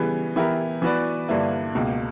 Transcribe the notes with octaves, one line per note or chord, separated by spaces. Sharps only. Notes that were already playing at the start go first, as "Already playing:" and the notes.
Already playing: C#3 E3 G3 B3
E3 B3 E4 G4 A#4
E3 B3 F#4 B4 D5
G2 D3 A#3 E4 B4
C#2 B2 A#3